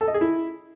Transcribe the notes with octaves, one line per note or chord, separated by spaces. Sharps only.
A4
D#5
G#4
E4